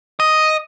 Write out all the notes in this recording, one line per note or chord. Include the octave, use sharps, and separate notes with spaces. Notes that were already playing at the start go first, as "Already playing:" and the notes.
D#5